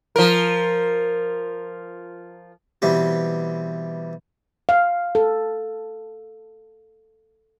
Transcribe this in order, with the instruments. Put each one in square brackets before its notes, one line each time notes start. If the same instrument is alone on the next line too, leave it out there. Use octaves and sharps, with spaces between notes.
[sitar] F3 A#4
[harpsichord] B2 E3 G3 C4 G4
[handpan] F5
A4